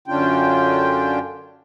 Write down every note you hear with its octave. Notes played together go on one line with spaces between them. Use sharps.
F#2 D3 C#4 D4 F4 G5